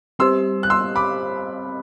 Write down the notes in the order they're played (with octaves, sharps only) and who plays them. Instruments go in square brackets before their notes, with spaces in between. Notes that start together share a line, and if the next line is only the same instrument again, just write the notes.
[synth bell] G3 C4 G4 C5 [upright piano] C6 E6
[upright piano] F#6
C6 E6
B5 D6